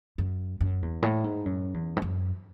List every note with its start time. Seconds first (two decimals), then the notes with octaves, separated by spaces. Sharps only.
0.18 F#2
0.61 F#2
0.82 E2
1.02 A2
1.24 G#2
1.46 F#2
1.74 E2
1.97 G#2
2.02 F#2